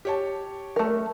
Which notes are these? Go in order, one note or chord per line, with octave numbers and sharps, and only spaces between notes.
G4 C#5 A5
A3 A#4